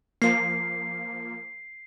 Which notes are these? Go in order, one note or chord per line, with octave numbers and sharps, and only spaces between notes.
F3 A#3 C7